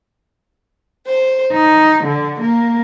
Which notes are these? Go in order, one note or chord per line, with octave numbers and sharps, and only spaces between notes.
C5
D#4
D3
A#3